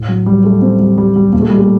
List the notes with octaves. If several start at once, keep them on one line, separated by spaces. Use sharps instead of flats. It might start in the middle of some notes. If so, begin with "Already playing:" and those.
Already playing: A2
F#3
G3
A3
C4
G3
G3
G3
A#2 A#3
A3
G3
A3